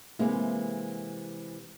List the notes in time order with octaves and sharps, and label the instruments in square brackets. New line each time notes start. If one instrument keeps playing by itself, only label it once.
[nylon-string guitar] C3 E3 G#3 A#3